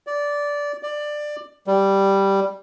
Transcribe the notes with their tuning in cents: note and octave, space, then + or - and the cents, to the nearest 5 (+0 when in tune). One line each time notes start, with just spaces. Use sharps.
D5 -15
D5 +15
G3 +0